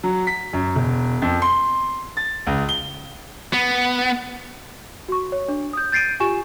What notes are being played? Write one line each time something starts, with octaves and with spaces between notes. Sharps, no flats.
F#3
B6
F#2
E1
F2
C6
A6
C#2
G7
B3
F#4 C#6
C#5
D4
D#6 G6
G6 A6 C7 D7 D#7
F4 G4 G#5 C#6 E7